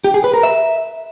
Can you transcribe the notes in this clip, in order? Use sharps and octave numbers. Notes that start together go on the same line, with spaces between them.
G4
G#4
B4
A#4
E5